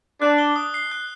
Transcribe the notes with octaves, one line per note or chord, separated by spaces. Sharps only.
D4 F#6
G7
D#6
C7
F#6